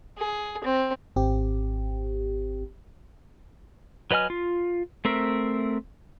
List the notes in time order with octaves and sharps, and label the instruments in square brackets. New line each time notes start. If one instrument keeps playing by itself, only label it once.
[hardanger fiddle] G#4
C4
[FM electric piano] G#1 C4 G4
[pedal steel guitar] F#3 B4 D#5 G#5 F6
F4
A3 C4 A#4 E5